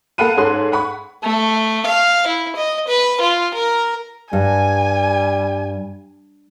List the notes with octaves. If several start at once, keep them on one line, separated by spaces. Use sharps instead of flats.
A#3 A4 F5 F#5 B5 D#7
G#2 C#4 G#4 A4 C6 F#6
F#5 B5 C#6
A3
F5
E4
D#5
B4
F4
A#4
G2 G3 G#5